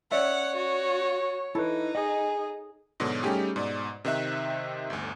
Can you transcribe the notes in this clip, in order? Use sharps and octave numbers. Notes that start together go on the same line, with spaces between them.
C#4 C#5 D5 E5 F#5
F#4
D#4 E4 A4 B4
G#4 D#5
G#2 B2 D3 F#3
G3 A3 C#4 D#4 G4 G#4
G#2 B2 D5
C3 D#3 C4 D#4 E5 F#6
G1 D2